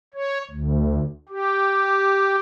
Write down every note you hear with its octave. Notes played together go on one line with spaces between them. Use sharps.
C#5
D2
G4